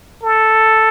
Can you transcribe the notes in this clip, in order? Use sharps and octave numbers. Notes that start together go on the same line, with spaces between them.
A4